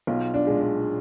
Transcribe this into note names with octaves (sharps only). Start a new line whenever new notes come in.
B1 F4
D4
A#2 G#3
D4